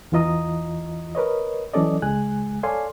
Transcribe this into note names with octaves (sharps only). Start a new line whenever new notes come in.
E2 E3 F4 D#5 A#5 D#6
A#4 B4 C#5 D#5
E3 F#3 C#4 A4 D5 D#5
C#2 G#3 G#5 F#6
A4 C#5 D5 F5 G#5 C6